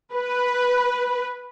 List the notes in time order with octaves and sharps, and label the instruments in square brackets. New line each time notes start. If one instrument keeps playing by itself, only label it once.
[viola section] B4